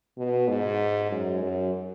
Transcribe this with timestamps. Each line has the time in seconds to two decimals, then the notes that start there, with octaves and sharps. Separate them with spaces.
0.18 B2
0.48 G#2
1.11 F#2
1.43 F#2